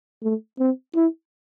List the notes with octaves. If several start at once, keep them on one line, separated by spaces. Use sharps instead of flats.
A3
C4
E4